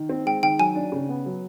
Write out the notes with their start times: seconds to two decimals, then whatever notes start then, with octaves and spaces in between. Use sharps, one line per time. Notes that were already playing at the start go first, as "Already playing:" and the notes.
Already playing: D#3
0.09 C4
0.26 G#3 G5
0.43 D#3 G5
0.59 F#3 G#5
0.75 D4
0.92 C#3
1.09 B3
1.26 F#3